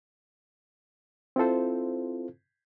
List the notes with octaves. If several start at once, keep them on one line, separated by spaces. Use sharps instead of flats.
C4 E4 F4 A4 C5